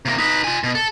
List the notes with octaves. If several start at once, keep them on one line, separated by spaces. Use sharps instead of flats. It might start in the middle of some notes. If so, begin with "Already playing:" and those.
C3 A#3
D#4 B4
F4 G#5
B2
A4